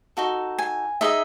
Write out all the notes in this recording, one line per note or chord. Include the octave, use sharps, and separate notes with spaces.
D#4 F#4 A4
G#5
D#4 G#4 B4 D#5 E5